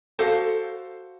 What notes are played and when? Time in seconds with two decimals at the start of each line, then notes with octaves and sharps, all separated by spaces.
0.19 F#4 A4 C5 F5